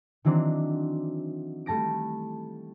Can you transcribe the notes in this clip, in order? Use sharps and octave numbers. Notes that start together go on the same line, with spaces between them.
D#3 E3 F#3 C4 D4
G3 A3 A5 A#6 D7